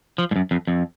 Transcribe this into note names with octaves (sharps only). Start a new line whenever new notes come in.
F3
G#2
F#2
F2
F2